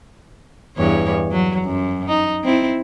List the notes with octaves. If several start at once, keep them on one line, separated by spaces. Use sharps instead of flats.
E2 G2 C#5
F#3
F#2
D#4
C4 E4